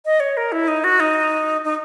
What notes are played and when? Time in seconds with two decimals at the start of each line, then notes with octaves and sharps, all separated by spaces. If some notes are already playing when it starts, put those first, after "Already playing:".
0.05 D#5
0.20 C#5
0.37 A#4
0.52 E4
0.68 D#4
0.84 F#4
1.00 D#4
1.64 D#4